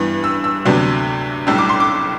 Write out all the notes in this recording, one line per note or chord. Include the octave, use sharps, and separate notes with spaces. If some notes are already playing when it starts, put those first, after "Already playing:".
Already playing: G2 E3 B3
E6
E6
D2 C3 F#3 B3 D4
B1 A2 G3 D4 E6
D6
C6
D6